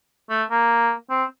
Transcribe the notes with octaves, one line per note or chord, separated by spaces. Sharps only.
A3
A#3
C4